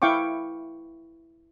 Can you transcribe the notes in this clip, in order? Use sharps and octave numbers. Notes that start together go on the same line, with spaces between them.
E4 F5 G5 C#6 D6